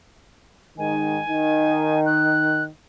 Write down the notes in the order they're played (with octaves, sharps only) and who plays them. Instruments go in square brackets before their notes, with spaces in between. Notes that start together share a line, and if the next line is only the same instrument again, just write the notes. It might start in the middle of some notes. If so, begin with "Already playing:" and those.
[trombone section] G#2 D#3 [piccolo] G#5
[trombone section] D#3
[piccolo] F#6